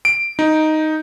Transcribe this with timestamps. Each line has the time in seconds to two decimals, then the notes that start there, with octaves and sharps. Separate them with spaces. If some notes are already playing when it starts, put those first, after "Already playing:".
0.05 D7
0.39 D#4